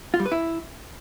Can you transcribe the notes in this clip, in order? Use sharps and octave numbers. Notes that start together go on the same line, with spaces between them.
F4
G3
B4
E4